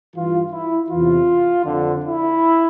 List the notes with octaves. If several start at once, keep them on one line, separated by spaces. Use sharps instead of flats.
G2 E3 F4
E4
E2 C3 E3 F4
F2 D3
E4